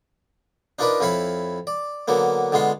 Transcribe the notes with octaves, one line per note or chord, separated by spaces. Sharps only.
D4 D#4 F4 A#4 B4 D5
F2 E4 C#5 F5 B5
D5
D3 F#3 A#3 B3
D3 G#3 B3 F4 C6